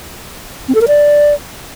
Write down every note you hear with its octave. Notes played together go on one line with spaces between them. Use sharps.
C4
A4
A#4
D5